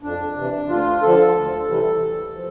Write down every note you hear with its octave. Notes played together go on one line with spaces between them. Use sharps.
F2 D4
C3 E3
D2 F4
D3 F3 A4
D2
C3 E3 G3
D2
F3